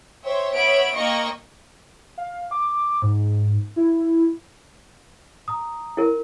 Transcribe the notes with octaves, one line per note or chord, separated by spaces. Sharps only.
C5 C#5 E5 G5
B3 C#5 E5 B5 D7
A#3 D#5 G5 C#6
F5
D6
G#2
E4
A#5 D#6
E4 A#4